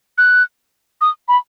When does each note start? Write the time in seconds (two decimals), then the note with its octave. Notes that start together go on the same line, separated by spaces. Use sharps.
0.18 F#6
1.01 D#6
1.28 B5